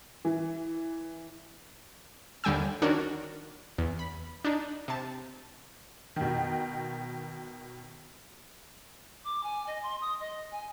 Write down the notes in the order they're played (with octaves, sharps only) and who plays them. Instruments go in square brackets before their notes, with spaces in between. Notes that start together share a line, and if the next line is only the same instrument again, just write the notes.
[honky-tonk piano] E3
[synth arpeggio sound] D#2 D3 G3 G5 G#5 E6
D#3 C#4 D4 F#4 A#4
E2
B5
D4 D#4
C3 A5
[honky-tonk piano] B2 D#3
[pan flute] D6
G#5
D#5
C6
D#6
D#5
G#5